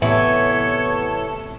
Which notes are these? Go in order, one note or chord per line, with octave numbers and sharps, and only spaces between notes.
A2 C3 E3 B3 A4 C#5